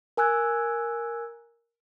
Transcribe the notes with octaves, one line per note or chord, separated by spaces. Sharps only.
A#4 G#5 E6 F#6 G#6